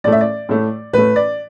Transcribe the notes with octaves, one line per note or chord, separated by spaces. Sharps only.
A2 A3 D5
E5
D5
A2 A3
A2 A3 B4
D5